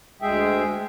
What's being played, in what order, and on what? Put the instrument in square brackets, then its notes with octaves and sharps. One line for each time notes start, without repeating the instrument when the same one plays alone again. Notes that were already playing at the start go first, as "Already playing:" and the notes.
[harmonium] D2 G#3 G#4 E5 G5